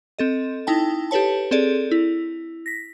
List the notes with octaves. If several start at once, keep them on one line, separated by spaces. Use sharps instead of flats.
C4 A4 D#5
D#4 E4 G5 A5
G4 A4 B4 C#5 A5
C4 G#4 A4 D5
E4
A#6 B6